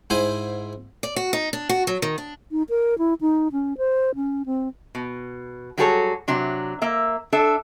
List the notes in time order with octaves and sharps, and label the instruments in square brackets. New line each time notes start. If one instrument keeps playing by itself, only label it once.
[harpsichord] G#2 E4 C5 G5 G#5
[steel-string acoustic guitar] D5
F#4
D#4
D4
F#4
F#3
D#3
D4
[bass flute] D#4
A#4
E4
D#4
C#4
C5
C#4
C4
[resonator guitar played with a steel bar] B2
F#3 G3 F#4 G#4 A4 C#5
C3 F#3 D4
A#3 E5
D4 A4 E5